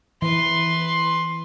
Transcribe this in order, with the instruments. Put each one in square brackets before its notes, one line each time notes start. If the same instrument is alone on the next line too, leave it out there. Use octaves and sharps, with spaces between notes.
[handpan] E3 [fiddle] B4 C6